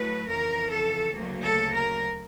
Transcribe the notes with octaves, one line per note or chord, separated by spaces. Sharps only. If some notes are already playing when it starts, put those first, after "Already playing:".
Already playing: A2 F#3 A3 B4
F2 C#3 E3 A#4
A4
D2 C#3 F#3 A#3
A4
A#4